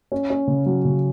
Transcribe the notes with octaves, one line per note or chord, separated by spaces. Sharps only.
C#4
C#4
C#3
F#3
C#3